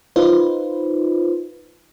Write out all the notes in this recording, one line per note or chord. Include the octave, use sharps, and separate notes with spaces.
D#4 F4 B4 C5